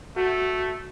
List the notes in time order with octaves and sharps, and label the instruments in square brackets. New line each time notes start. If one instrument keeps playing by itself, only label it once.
[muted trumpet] A3 [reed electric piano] F#4